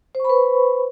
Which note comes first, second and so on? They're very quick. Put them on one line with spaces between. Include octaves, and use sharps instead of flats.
C5 C#6 B5 B4